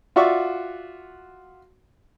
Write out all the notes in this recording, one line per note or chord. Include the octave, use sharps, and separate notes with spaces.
F4 F#4 D5 E5 C#6